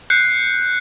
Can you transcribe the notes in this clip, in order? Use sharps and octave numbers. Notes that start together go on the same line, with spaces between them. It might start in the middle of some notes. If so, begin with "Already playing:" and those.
F#6 G6 C7 C#7